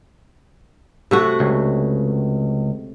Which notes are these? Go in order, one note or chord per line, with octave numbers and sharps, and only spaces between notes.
C3 A3 F#4
C#2